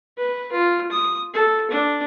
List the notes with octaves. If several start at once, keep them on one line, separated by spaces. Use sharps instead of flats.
B4
F4
D#6
A4
D4